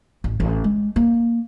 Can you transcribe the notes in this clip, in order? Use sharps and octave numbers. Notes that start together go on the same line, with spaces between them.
A1
A1
G#3
A#3